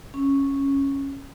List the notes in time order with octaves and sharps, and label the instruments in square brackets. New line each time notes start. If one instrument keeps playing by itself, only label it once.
[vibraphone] C#4